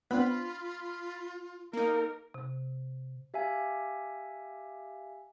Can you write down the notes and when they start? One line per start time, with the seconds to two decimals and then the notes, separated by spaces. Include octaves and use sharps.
0.11 B3 C4 D4 F4 B5
1.73 A#3 D#4 A#4
2.34 C3
3.34 G4 E5 F5 G#5